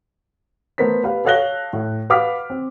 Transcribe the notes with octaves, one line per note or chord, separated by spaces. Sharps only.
A3 B3 A#4 C5 B6
G4 B4 F5
A4 C#5 F5 F#6 A#6 G7
A2
B4 F5 F#5 D6 F6 B6
C4